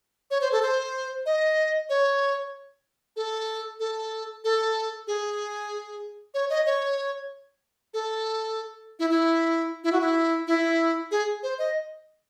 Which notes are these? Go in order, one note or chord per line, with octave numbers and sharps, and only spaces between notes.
C#5
C5
A4
C5
D#5
C#5
A4
A4
A4
G#4
C#5
D#5
C#5
A4
E4
E4
E4
F#4
E4
E4
G#4
C5
D#5